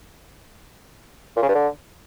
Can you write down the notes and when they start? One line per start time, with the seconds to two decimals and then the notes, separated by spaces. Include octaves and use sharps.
1.36 A#2
1.43 C#3
1.49 G2
1.55 D3